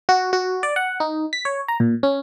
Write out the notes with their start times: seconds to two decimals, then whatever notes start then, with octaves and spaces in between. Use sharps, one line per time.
0.09 F#4
0.33 F#4
0.63 D5
0.76 F#5
1.00 D#4
1.33 B6
1.45 C#5
1.68 A#5
1.80 A#2
2.03 C#4